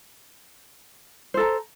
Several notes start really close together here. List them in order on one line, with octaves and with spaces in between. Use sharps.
C5 A4 A#5